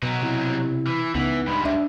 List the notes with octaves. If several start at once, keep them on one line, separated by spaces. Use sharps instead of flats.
B2 F#3 D#4
C3 E4
E3
C#2 E3 B3 D#4
G2 G#3 B5
D4 D5 E5